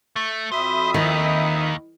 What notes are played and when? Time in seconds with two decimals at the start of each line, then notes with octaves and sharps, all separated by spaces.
0.16 A3
0.52 F2 F#4 C5 E5 B5 D#6
0.94 D#2 D#3 D#5 B5